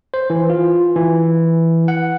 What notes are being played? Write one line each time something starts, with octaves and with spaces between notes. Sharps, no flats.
C5
E3
F4
E3
F#5